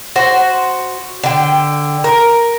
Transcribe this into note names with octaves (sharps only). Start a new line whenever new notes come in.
F#4 C5
D3 G5
A#4